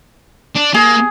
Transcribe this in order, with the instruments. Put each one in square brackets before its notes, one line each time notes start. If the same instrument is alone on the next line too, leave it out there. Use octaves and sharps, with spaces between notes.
[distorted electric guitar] D4
[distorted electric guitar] A#3 [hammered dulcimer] G#4